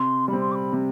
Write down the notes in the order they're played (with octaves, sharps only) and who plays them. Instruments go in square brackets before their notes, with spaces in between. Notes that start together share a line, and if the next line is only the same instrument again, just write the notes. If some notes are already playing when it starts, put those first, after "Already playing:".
Already playing: [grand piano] C3 [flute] C6
[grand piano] G3 [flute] B5
[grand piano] C4
[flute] C6
D6
B5
[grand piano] C3